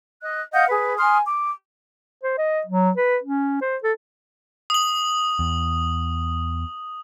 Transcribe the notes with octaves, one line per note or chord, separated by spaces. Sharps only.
D#5 F#6
D#5 F5 F#5 G6
G#4 B4
G#5 C6 D#6 F6
D6
C5
D#5
F#3
B4
C#4
C5
A4
D#6 F#7
E2